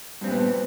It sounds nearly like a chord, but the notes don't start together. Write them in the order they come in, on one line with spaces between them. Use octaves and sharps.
G2 C4 A#2 B3